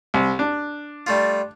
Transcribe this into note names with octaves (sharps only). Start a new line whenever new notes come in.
C2
D4
G3 A3 F4